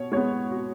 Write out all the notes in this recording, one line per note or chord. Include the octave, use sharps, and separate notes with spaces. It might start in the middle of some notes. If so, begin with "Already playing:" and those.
Already playing: B2 C#5
G#3 B3 C#5
F#4